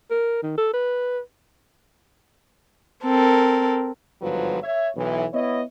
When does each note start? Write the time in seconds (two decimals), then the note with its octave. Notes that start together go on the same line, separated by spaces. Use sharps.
0.11 A#4
0.43 D#3
0.58 A4
0.73 B4
3.03 C4 A4 A#4
4.21 G1 G#2 F3 F#3 B4
4.62 C#5 E5
4.96 B1 E3
5.33 B3 E4 C#5 D#5